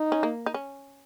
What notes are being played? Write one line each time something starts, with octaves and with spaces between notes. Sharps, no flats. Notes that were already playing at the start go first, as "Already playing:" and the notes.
Already playing: D#4
C#4
A#3
D#4
C#4